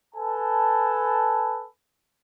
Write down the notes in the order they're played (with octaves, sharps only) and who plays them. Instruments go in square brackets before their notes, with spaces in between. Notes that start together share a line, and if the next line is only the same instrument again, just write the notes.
[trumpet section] A4 B4 G#5 A5